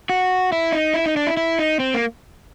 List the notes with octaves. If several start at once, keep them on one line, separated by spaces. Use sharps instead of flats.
F#4
E4
D#4
E4
D#4
D4
E4
E4
D#4
C4
A#3